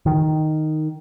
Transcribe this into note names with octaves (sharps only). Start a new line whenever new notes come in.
D#3